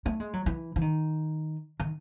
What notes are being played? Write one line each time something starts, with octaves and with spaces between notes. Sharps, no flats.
A3
G#3
F#3
E3
E3
D#3
D#3